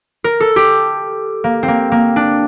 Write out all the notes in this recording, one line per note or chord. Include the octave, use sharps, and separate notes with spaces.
A#4
A4
G4
A#3
C4
A#3
A#3
D4